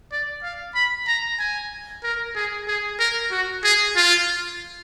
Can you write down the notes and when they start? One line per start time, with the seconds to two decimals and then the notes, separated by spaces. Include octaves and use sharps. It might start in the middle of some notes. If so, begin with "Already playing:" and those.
0.12 D5
0.43 F5
0.75 B5
1.08 A#5
1.39 G#5
2.03 A#4
2.36 G#4
2.68 G#4
2.99 A#4
3.31 F#4
3.64 G#4
3.96 F4